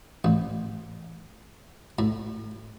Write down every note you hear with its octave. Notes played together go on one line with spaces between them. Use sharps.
A1
A2